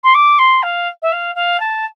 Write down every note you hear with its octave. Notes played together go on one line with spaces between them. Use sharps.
C6
D6
C6
F5
E5
F5
F5
A5